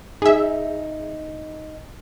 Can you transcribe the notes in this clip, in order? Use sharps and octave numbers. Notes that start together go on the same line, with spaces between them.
D#4 G#4 E5